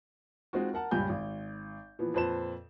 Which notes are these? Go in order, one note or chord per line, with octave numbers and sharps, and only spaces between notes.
G#3 C4 D#4 F4 F#4
A#4 F#5 A5
C#2 G2 A#2 G4 G#5 G6
G#1
A#2 E3 F3 B3
F2 A#2 B4 C5 A5 E7